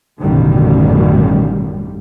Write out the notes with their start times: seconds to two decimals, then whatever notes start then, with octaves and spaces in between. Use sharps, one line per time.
0.21 A1 F#2 B2 D3 D#3 G3